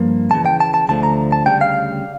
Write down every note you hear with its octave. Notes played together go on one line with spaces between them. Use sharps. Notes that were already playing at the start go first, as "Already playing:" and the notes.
Already playing: G2 F3 A#3
D2 C#3 E3 A5
G5
A5
A5
D2 D3 F3 A3 A5
A#5
A5
D2 C#3 G3 G5
F5